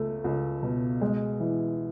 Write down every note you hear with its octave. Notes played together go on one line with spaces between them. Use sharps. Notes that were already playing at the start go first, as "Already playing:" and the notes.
Already playing: C#2 A3
C#2
B2
G#3
E3